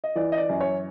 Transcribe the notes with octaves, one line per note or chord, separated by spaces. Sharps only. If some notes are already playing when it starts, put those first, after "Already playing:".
D#5
E3 D5
D#5
D5
F#2
C#5